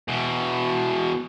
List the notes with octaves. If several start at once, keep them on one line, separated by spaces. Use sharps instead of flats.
E2 B2